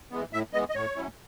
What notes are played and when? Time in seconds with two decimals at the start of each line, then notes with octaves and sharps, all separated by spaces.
0.11 E3 G#3 B3
0.33 A2 E5
0.53 E3 G#3 B3 D#5
0.70 D#5
0.75 A2 C#5
0.96 F#3 C#4 E4